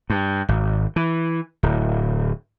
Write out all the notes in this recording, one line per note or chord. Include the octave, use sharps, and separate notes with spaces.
G2
G#1
E3
D1